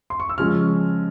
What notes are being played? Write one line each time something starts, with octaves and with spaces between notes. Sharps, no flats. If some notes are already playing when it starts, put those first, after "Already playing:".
C6
C#6
E6
C#3 F3 G#3 C#4 F6